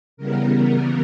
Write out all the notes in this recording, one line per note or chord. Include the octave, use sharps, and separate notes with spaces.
C#3 E3 G3 B3 A#4